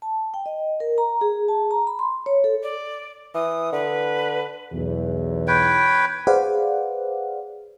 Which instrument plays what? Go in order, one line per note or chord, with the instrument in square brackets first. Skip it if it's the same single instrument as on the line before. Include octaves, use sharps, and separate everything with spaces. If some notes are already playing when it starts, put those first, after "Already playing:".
[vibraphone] A5
G5
D#5
A#4
A#5
G#4
A5
A#5
B5
C6
C#5
A4
[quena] D5
[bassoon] E3 [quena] D#6
[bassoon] D3 [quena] B4
[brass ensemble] B1 E2
[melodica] B4 C#5 G5
[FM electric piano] G#4 B4 C5 D5 F5 F#5